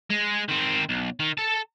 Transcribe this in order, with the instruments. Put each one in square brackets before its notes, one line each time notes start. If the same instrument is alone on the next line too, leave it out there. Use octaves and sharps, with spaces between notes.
[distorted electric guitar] G#3
D#3 C4
B1
D#3
A4 A5